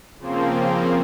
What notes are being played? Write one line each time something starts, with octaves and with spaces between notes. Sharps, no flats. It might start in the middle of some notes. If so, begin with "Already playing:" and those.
C#3 F3 A#3 C4